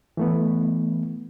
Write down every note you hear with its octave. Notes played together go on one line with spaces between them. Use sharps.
E3 A3 B3